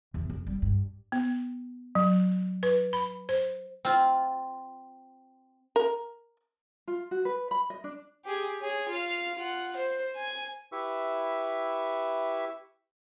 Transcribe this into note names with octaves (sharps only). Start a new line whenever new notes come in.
E2
F2
G3
G2
B3
F#3
B4
B5
C5
C4 F4
A#4
F4
F#4
B4
B5
D#5
D4
G4 G#4
G#4 C#5
F4 F5
F4 F#5
C5
G#5
E4 G4 B4 E5 C#6 E6